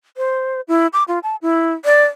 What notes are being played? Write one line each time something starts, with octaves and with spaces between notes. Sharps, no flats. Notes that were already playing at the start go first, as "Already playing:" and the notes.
C5
E4
D6
F4
A5
E4
D5